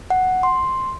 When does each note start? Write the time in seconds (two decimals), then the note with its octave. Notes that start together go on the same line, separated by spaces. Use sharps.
0.10 F#5
0.43 C6